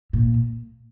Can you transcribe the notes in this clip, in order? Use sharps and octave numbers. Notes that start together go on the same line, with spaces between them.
A#2